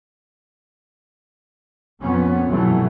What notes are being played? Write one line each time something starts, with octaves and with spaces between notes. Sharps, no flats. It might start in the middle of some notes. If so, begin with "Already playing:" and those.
F2 A#2 B3 C#4
G2 B2 E3 F#3 A3